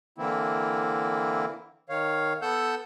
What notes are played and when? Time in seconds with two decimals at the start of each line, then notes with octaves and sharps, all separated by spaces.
0.18 D3 E3 A#3 C4 E4
1.89 D#3 C#5 F5
2.42 B3 A4 F#5 E6 F#6 G6